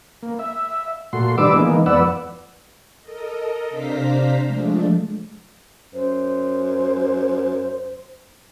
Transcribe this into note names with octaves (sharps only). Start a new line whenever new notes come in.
A#3
E5
A#2 A3 F#4 C6
D#3 G3 D4 B4 D6 E6
E3 G#3 A#3 B3 D#4
F2 B3 B4 D5 F#5 E6
A4 A#4 D#5
C3 D4 C5 F5 A#5 B6
F3 G#3 A3 D4
F#2 C5